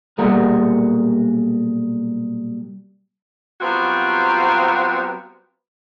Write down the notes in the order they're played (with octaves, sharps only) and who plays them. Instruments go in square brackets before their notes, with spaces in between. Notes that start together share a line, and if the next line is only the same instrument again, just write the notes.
[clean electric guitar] B1 A#2 G3 G#4 A#4 F#5
[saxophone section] F#3 G3 B3 C4 F4 F#4